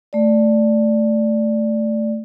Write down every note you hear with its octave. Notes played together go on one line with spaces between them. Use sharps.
A3 D5